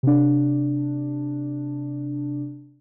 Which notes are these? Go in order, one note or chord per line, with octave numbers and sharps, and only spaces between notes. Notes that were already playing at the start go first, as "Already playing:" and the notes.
C3 D4